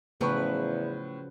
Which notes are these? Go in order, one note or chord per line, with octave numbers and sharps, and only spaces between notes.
E2 A2 C#3 F3 F#3 B4 C#6